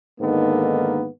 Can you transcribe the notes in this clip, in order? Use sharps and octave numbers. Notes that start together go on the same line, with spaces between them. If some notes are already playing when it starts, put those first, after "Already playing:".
G#2 D3 D#3 A#3 B3 A4